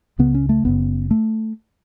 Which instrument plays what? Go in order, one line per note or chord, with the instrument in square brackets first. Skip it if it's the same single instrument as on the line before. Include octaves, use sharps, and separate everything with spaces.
[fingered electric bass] C#2 C#3 B3
C#4
A3
F#1 F#2 C#3 B3
A3